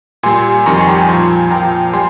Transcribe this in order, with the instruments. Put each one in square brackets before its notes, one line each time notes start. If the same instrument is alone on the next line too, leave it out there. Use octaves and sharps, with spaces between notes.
[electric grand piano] A#2 G3 G#5 C6
F2 D#3 G3 A#5 C#6
G#5 C6
G5 A#5
G#5 C6
A#2 F3 G#5 C6
A#2 F3 G5 A#5
G3 G#5 C6